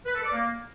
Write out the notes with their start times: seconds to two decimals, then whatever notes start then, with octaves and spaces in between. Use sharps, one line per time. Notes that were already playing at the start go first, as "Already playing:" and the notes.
0.06 B4
0.15 A4
0.24 D5
0.33 A#3